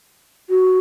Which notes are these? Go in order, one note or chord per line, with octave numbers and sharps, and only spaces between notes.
F#4